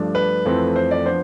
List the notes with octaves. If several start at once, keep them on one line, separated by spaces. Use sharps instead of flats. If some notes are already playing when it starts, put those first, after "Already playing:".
Already playing: G2 F3 A3 D4
B4
F2 E3 A3 C4
C5
D5
F3 B3 D4 C5